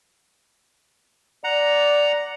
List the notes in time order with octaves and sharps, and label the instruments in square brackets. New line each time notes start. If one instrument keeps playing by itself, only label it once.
[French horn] D5 [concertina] F#5 A#5